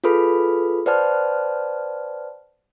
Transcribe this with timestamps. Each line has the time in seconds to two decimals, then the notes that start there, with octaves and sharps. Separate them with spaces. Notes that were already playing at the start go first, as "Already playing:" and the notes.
0.04 F4 G#4 A4 B4 B5
0.86 B4 C5 D5 F#5 A5 F6